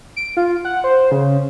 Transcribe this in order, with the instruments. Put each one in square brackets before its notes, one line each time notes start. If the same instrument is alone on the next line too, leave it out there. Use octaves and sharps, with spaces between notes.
[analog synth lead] D7
F4
F#5
C5
C#3